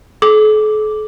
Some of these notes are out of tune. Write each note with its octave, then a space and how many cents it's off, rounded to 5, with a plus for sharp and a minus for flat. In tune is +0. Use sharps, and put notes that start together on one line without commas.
A4 -45 D6 +0